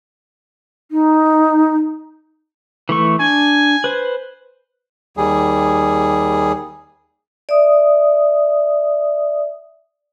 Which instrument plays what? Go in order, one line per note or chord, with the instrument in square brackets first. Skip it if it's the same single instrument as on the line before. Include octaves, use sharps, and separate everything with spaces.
[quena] D#4
[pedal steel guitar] E3 A3 C#6
[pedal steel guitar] D4 [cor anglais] G#5
[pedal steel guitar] B4 C5
[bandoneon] D#2 G3 G#4
[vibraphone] D5 E5 D#6